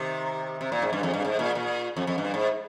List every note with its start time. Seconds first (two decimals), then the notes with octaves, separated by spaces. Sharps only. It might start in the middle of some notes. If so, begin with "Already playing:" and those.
Already playing: C3 D#3
0.61 C3
0.72 A#2
0.82 G#2
0.93 G2
1.03 F2
1.14 G2
1.25 G#2
1.39 A#2
1.55 A#2
1.97 F2
2.07 F2
2.18 G2
2.34 G#2